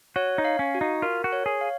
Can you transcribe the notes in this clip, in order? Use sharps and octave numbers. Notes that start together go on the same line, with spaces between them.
F#4 C#5
D#4
F5
C#4
F#4
D#4
F4 A#4
F#4
C#5
G#4
F5